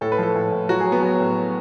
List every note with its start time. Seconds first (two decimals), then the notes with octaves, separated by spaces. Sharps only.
0.01 A2 A4
0.12 B4
0.18 F3 A4
0.35 A2
0.52 A2
0.69 F#3 F#4
0.80 G#4
0.86 F#3
0.92 B3
1.03 F#3
1.20 A2